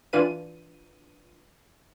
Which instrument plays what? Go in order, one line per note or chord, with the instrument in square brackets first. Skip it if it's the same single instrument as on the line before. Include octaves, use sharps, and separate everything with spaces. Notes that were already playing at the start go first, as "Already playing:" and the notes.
[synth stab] E3 D4 F4 B4 D#7